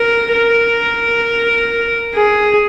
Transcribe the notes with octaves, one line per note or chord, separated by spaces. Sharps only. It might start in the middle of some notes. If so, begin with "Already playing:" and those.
Already playing: A#4
A#4
G#4